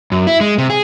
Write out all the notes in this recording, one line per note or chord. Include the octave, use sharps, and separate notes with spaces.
F#2
E4
G#3
C3
G#4